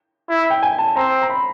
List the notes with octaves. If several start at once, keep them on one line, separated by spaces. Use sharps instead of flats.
E4
G5
G#5
A5
C4 A#5
A#5
B5